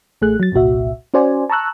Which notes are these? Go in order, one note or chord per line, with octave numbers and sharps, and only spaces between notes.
A1 A3 G#4 F#6
F#3 A6
G1 C2 A#2 F#4 E5
C#4 F#4 C5 D5 G#5
A5 A#5 C#6 E6 F#6